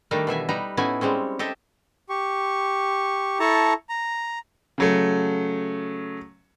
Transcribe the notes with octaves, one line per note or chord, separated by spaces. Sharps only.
D#3 G3 A3 D4 A#4 G5
B2 E3 E5 G#5
G3 D#4 B4 A#5
A2 B3 C#4 D#4 E4 G#5
G3 G#3 C4 C#4
G4 A4 D#5 E5
G4 C#6
E4 A4 A5 A#5 C#6
A#5
C#3 F#3 A3